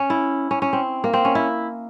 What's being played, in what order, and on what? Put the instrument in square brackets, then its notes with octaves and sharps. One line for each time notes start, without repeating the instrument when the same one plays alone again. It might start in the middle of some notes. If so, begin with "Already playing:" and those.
Already playing: [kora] C#4
E4
C#4
C#4
C4
A#3
C4
C#4
E4